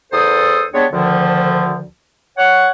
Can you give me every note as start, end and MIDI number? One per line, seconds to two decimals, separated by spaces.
0.12 0.65 40
0.12 0.65 69
0.12 0.65 72
0.12 0.65 87
0.74 0.85 55
0.74 0.85 56
0.74 0.85 59
0.74 0.85 62
0.74 0.85 73
0.92 1.83 38
0.92 1.83 50
0.92 1.83 51
0.92 1.83 53
2.37 2.71 73
2.37 2.71 78